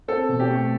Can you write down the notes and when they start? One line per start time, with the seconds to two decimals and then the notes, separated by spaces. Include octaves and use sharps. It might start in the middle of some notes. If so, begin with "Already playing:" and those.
0.08 C4 A4
0.29 B2
0.40 G4
0.50 A3